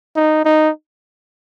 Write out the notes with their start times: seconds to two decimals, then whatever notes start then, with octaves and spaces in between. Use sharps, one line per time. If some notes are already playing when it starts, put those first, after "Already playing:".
0.16 D#4
0.45 D#4